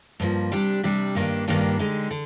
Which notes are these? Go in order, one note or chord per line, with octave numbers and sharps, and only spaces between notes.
G2 F3 A#3
C3 G3 D4 G4
C3 G3 D4 G4
G2 D#3 A#3 D4 G4
G2 D#3 A#3 D4 G4
D3 G#3 D#4 G4
D3